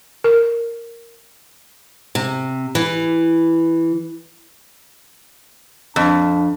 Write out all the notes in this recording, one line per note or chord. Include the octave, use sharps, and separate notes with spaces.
A#4
C3
E3
F2 D4 A5